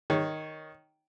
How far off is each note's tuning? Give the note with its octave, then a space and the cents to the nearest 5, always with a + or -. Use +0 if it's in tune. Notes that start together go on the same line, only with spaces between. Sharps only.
D#3 +0 C#5 +0